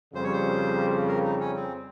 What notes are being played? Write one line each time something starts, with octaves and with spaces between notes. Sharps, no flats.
F2 C#3 G3 C5
C#5
C5
A#4
D#4
C#4
C4